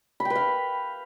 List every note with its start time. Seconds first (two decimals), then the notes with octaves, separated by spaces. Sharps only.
0.20 B5
0.25 G5
0.30 B4
0.35 F5